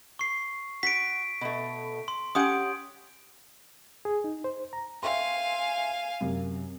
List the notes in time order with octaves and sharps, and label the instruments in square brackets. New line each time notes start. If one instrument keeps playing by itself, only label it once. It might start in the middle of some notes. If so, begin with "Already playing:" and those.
[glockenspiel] C#6 C7
[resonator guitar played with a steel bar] F#4 [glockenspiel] B6 D7
[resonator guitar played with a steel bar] B2 A3
[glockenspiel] C6
[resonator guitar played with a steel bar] C#4 G4 F#5 [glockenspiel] D#6 D7
[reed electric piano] G#4
D#4
C5
A#5
[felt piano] E5 G5 C6 [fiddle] F5 G#5
[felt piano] F#2 C3